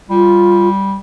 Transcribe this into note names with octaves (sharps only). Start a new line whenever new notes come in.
G3 F4